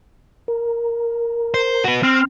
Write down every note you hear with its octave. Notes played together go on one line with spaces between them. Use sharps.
A#4
C5
F#4 B4
C4 C6 F6